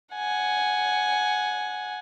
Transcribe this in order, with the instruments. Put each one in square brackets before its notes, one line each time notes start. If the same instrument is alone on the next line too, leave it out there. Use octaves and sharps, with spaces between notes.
[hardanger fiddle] F#5 G#5